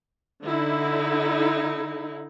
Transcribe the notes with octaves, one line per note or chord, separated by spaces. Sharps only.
D3 D#4 E4